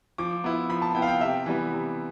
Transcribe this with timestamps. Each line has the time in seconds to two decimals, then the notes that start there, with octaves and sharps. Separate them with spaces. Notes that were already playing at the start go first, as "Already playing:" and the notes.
0.18 F3 D6
0.44 B3 E4
0.69 F3 B5
0.82 A5
0.95 B3 E4 G5
1.02 F5
1.08 G5
1.21 C3 E5
1.46 E3 G3 B3
1.71 C3